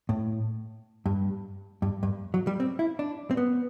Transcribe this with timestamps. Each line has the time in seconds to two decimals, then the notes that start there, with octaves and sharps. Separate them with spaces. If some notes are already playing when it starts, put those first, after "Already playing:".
0.09 A2
1.06 G2
1.82 G2
2.03 G2
2.34 F#3
2.47 G3
2.60 C4
2.79 E4
2.99 D4
3.31 C4
3.37 B3